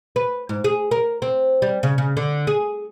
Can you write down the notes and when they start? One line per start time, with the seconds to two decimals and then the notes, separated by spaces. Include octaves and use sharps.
0.16 B4
0.49 G#2
0.64 G#4
0.91 A#4
1.22 C4
1.62 G3
1.83 C#3
1.98 C#3
2.17 D3
2.47 G#4